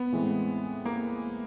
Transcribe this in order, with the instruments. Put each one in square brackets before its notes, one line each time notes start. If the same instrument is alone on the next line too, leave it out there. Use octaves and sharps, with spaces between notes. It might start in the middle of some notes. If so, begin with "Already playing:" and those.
Already playing: [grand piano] B3
[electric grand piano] A2 E3 G#3 C4
[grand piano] A#3